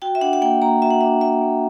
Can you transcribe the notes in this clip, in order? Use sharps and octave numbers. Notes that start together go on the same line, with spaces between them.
F#4 G5
E5
D4 F#5
F#5
A#3 G5
A#3 A#5
F#4 E5
F#5
D4 E5
A#3 E5
A#3